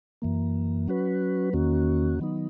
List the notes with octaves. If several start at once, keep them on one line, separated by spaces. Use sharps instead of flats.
F#2 E3 A#3
F#3 C#4 F#4 B4
E2 D#3 A#3 C#4 F#4
D#3 F#3 B3 D#4